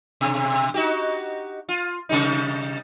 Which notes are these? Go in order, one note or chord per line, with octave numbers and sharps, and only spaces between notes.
B2
D#4 F#4 G4
F4
C3 G3 D#4